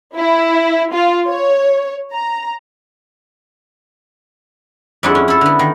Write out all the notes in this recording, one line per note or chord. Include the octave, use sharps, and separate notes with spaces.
E4
F4
C#5
A#5
F2 G#3 D4 E4 G#4 F#5
C#4
E4 A4
D3 B3
D#3